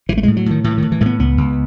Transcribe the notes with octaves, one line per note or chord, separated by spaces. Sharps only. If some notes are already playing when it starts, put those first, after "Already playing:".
A1 E3
A3
A2 G#3
F#3
A2 D#3
A2 E3
A2 D#3
E3
A2 A3
B3
C#2 B3
C#2